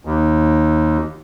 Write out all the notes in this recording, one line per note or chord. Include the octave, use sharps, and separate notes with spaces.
D#2